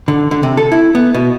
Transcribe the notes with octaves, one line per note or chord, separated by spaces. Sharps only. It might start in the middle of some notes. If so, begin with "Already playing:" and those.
D3
D3
C3
A4
E4
B3
B2